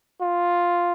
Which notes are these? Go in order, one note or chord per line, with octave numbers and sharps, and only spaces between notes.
F4